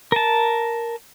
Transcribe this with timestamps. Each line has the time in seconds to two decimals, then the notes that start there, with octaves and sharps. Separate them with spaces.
0.12 A#4 A5